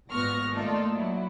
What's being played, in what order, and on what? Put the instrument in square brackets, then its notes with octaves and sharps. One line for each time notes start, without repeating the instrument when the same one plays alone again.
[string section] G#1 A#2 B3 C#6 F6 A#6
A3 A#3 D#4 F4 A4 D5
F#3 E4